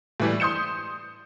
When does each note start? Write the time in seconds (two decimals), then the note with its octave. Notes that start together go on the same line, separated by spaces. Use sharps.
0.20 A2 E3 G3
0.40 C6 D#6 G6 C#7 E7